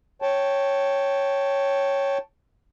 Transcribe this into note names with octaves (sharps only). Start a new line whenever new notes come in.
C#5 G5 A5